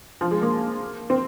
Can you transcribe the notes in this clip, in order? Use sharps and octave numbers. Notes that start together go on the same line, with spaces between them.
F3
G#3
A#3
C4